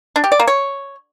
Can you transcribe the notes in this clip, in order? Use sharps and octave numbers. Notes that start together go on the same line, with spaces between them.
D4
G4
D5
A#3
C#5